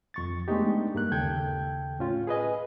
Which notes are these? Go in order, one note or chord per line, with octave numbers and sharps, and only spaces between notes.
F2 C#6 A6
G#3 A3 B3 D4 D#4 G4
G2 A#3 F#6
D#2 C#3 A4 G5 G6 G#6
A2 C#4 F4
G#4 B4 D#5 G#5